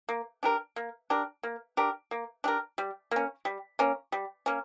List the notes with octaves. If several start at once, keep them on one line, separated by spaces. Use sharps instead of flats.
A#3
D4 G4 A#4
A#3
D4 G4 A#4
A#3
D4 G4 A#4
A#3
D4 G4 A#4
G3
A#3 C#4
G3
A#3 C#4
G3
A#3 C#4